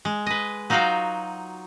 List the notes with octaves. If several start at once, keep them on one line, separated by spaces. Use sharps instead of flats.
G#3
B4 D#5
F#3 D#4 F4 F#4 F5 G5